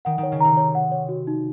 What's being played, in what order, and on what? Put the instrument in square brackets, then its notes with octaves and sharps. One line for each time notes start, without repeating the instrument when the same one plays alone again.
[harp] D#3 [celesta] F#5
[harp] D#3
[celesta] C#5
[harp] C#3
[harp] C3 [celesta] A#5
[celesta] C#5
F#5
C#5
F#4
D#4